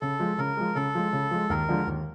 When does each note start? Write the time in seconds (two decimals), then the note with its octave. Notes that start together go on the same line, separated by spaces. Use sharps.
0.01 C#3 A4
0.20 F3 G#3
0.38 C#3 A#4
0.57 F3 G#3
0.75 C#3 A4
0.95 F3 G#3
1.13 C#3
1.31 F3 G#3
1.50 D#2 A#4
1.69 D3 F3 G#3
1.87 D#2